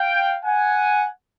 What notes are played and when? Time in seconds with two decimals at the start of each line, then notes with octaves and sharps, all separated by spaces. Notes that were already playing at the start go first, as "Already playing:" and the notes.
Already playing: F5 G5
0.43 F#5 G#5